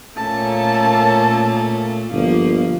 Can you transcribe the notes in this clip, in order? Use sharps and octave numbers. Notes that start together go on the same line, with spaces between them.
A#2 A3 A#3 C#4 A4 A5
G1 F3 A#3